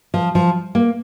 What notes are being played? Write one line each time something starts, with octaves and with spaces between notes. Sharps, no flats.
F3
F3
A#3